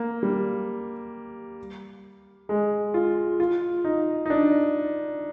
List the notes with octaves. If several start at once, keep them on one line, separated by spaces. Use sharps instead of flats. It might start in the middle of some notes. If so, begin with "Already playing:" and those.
Already playing: A#3
G3
G#3
F4
F4
D#4
D#4
D4